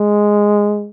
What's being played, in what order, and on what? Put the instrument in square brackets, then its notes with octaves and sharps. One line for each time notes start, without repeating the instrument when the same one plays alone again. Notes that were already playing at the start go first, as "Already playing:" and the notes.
Already playing: [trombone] G#3